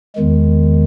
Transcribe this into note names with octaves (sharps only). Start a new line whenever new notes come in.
E2 D#3 G#3